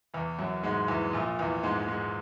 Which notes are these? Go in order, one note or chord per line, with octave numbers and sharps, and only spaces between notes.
E2 E3
F#2 F#3
G#2 G#3
E2 E3
A#1 A#2
E2 E3
G#2 G#3
G#2 G#3